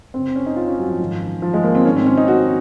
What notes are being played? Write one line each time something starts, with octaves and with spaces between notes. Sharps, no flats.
F#2 C#3 C4
C#4
D#4
F4
C#4
F#3
F3
G#2 D#3
F3
G#3
A#3
C4
G#2 D#3 C#4
C4
C#4
D#4
F#4